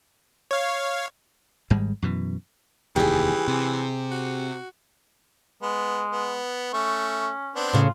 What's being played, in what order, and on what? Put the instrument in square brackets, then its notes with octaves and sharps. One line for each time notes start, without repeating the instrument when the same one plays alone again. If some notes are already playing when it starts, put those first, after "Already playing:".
[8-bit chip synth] C#5 F5
[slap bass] G#1 G#2 G3 G#3
F#2 B2 E3
[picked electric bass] F1 D#2 [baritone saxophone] E3 [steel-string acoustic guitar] G4 G#4
[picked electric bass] C3
[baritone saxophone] F#4
[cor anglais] G#3 [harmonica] B3
[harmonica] B3
[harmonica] A3 C#6 [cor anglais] C#4
[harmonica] B3 C4 D4
[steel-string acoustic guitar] A2 C#3 [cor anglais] F4